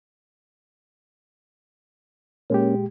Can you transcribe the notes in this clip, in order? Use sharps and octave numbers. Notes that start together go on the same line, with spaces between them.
A#2 G#3 A#3 C#4 G4